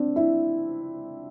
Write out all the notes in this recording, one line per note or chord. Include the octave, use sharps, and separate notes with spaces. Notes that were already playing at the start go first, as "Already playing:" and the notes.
Already playing: C4 D4
E4